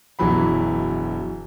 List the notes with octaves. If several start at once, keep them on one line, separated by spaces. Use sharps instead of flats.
E1 F#2 E3 F#3 B5